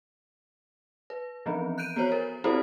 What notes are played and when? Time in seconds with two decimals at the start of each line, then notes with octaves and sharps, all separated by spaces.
1.10 B4
1.46 E3 F3 B3 C4
1.78 F#6 G6 D7 D#7
1.96 B3 F#4 C5 C#5
2.12 A#4
2.44 C4 E4 F#4 G4 A4 C5